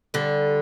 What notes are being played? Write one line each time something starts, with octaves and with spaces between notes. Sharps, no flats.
D3 G3